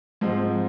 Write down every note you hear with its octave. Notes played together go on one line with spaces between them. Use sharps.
G#2 F3 G#3 C4